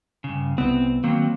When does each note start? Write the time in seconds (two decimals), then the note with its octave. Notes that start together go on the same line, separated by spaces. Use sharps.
0.24 G2 C#3
0.58 C2 B3 C4
1.04 D#3 F#3 A#3 C4